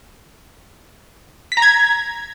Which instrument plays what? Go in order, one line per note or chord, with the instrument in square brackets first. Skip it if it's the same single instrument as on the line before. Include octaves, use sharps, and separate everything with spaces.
[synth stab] B6
A#5
G#6